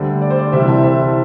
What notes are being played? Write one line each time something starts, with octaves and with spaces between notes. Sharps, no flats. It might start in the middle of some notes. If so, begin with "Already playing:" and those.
Already playing: D2 D3 G3 C5
D5
C5
D5
C2 C3 E3 G3 C5 E5
E5 A5
C5 E5